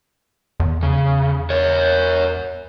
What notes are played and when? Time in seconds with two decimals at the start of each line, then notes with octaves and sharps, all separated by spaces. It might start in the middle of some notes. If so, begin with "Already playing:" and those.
0.60 E2
0.83 C#3
1.50 A#4 C#5